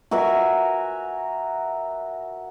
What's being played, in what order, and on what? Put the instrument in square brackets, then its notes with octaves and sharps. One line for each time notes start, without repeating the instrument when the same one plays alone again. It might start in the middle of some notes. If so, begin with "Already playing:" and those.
[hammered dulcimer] F#4 A#4 E5 G#5